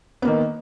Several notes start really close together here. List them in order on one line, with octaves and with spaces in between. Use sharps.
B3 A#3 D#3